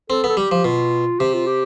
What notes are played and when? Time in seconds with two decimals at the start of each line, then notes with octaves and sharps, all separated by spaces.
0.10 C4 A4
0.24 B3
0.29 A4
0.37 G3 G4
0.51 F3
0.64 B2 F4
1.19 C3 G4
1.34 F4
1.47 G4